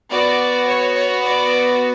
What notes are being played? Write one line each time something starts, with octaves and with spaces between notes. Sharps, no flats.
B3 F#4 D5
C#5
C#5
D5